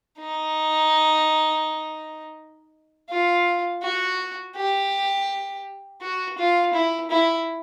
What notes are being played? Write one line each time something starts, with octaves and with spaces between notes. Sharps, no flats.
D#4
F4
F#4
G4
F#4
F4
E4
E4